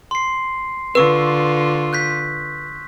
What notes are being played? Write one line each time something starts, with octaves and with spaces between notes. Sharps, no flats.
C6 C7
D3 F4 B4 C#6 E6
F#6 G6 B6